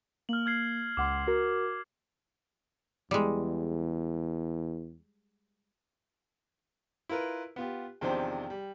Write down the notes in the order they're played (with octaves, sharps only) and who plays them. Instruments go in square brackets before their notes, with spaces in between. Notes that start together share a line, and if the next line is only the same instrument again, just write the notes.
[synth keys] A#3 [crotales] F6 F#7
[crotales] F6 G#6 C7
[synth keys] C#2 F#5 C6 [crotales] D6
[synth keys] F#4 A#4
[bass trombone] E2 [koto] G3 G#3
[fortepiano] E4 F4 A#4 B4
B3 F4 G4
E2 C3 D#3 F3 D4 C5
G3